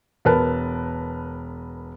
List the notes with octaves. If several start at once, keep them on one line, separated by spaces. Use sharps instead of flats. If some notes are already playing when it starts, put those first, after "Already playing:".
E1 A#4 B4 A5